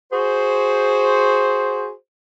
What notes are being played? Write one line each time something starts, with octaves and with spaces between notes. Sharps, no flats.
F#4 G#4 C5